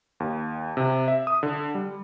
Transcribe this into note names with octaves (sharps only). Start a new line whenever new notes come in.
D#2
C3
E5
D#6
D3
G3